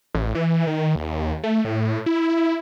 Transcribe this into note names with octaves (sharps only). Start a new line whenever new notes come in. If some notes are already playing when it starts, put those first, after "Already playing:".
A1
E3
D#3
D#2
A3
A2
E4